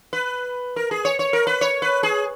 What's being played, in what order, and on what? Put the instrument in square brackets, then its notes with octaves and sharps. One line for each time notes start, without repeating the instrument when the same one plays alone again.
[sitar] B4
A#4
G#4
C#5
C#5
A#4
B4
C#5
B4
G#4